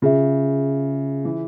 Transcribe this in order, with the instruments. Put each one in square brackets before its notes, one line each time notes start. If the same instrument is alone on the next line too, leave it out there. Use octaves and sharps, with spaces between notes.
[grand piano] C#3 [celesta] F4 G#4 E5
[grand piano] E3